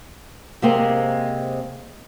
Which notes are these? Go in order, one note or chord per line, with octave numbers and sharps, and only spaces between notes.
C3 G#3 A#3 C4